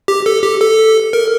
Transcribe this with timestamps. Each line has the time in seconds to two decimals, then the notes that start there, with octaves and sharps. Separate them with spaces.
0.08 G4
0.26 A4
0.43 G4
0.61 A4
1.13 A#4